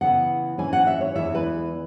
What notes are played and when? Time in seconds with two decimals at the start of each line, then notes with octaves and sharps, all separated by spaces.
0.01 C#3 E3 B3 E4 F#5
0.58 G#2 E3 C#4 E4 G#5
0.73 F#5
0.87 E5
1.01 C#5
1.15 E2 E3 G#3 E4 E5
1.35 B4